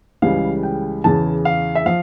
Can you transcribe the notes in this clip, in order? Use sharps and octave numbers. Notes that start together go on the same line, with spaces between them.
C#2 C#3 E3 G3 F5
G5
E2 C#3 E3 A5
F5
E5
F3 F5